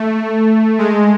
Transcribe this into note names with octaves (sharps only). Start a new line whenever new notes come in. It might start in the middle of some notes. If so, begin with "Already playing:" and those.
Already playing: A3
G#3